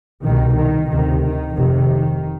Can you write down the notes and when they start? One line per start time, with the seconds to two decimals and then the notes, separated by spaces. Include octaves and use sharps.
0.24 C2 B2 D#3
0.57 D#3
0.90 D2 C3 D#3
1.24 D#3
1.57 F1 F2 C3 D#3